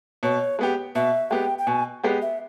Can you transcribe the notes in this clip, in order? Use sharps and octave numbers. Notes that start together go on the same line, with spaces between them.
B2 C#5
G#3 B3 G4
B2 E5
G#3 B3 G4 G5
G5
B2 G#5
G#3 B3 G4
E5